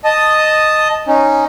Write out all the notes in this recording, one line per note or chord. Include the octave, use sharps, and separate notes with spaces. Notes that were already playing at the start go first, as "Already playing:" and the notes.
D#5 A5 D#6
C#4 D#4